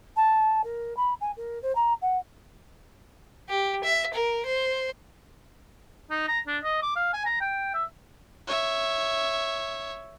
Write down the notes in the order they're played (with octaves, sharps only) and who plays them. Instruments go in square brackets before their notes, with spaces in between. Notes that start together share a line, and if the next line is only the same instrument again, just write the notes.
[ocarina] A5
A#4
B5
G#5
A#4
C5
A#5
F#5
[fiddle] G4
E5
A#4
C5
[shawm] D#4
A#5
D4
D#5
D6
F5
G#5
A#5
G5
E5
[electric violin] C#5 E5